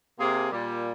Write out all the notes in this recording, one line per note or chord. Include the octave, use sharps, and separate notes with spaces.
C3 A#3 G#4
A#2 G3